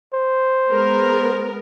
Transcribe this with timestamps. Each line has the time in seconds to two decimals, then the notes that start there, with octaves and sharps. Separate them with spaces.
0.14 C5
0.71 G#3 B3 A#4